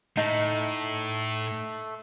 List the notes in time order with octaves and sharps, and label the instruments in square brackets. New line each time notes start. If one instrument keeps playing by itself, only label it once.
[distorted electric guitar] A2 [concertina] A3 [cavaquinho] D#4 A5